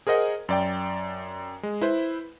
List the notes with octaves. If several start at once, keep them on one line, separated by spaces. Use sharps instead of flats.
G#4 A#4 C5 D#5 F#5
F#2 D5 G5
G#3
E4 B4 C5